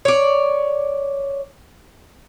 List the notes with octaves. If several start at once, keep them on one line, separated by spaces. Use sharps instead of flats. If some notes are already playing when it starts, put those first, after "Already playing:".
C#5 D5